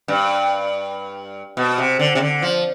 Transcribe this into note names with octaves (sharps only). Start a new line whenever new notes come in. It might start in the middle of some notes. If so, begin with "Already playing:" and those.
G2
B2
C3
D3
C3
D3
F3